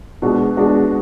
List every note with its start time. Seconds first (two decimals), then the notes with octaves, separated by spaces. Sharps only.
0.22 B2 G#3 D4 F#4
0.57 B2 G#3 D4 F#4